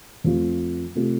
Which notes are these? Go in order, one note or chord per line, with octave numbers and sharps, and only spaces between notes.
F2 F3 A3 F4
C3 A3 F4